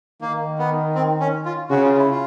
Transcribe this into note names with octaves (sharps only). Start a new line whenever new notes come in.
D#3 A#3
B3
C4
C#4
F4
C#3 F#4
F4
E4
F4